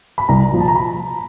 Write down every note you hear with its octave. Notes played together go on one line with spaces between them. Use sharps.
B5
C2 A#5
A#2 F3
A5
A#5
B5